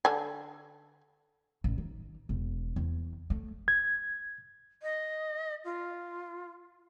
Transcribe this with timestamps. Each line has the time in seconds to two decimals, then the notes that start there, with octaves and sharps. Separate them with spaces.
0.05 D3 D4 G#5
1.64 A1
1.78 D#3
2.29 E1
2.76 E2
3.30 A3
3.68 G#6
4.83 D#5
5.65 F4